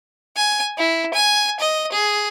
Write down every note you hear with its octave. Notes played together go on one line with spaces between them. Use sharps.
G#5
E4
G#5
D#5
G#4